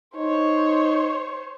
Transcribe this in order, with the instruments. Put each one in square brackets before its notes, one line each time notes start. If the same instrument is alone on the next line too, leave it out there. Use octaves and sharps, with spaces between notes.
[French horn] D#4 [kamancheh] C5 C#5